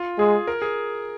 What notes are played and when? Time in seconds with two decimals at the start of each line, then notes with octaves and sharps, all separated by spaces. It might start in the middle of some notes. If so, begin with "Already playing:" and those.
Already playing: F4
0.19 G#3 G#4
0.47 A#4
0.62 G#4